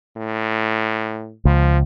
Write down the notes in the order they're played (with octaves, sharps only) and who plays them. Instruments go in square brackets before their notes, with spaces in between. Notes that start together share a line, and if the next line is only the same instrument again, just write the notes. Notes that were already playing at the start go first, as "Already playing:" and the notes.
[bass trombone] A2
[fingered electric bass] C#2 [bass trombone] F3